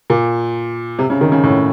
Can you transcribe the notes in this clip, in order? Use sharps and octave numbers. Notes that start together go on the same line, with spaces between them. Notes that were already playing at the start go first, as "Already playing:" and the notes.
A#2
C3
C#3
D#3
C#3
A2